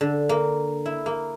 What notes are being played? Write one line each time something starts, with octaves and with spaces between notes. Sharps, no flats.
D3
A#3
E4
A#3